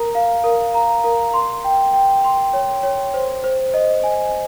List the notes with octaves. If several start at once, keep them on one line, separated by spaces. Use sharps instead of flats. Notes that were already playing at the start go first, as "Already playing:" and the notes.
Already playing: A#4 A#5
F5
A#4
A#5
A#4
C6
G5
G5
C6
C#5
C#5
C5
C5
D#5
G#5